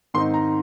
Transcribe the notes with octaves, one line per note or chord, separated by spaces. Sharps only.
G#2 D#3 C4 D#4 C6
A#5